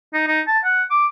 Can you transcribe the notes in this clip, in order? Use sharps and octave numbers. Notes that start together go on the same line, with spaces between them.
D#4
D#4
A5
F#5
D6